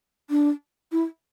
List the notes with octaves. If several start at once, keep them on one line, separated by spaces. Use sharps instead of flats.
D4
E4